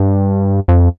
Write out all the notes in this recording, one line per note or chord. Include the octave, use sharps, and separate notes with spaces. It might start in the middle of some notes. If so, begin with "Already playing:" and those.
Already playing: G2
F2